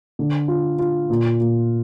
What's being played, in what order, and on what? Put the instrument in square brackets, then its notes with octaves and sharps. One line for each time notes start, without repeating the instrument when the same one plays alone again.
[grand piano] D3
F4
F4
A#2
A#2